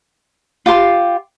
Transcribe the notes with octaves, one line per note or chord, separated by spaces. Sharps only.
F4 G4 C6